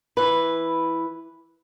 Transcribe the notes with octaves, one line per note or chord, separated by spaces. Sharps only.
E3 B4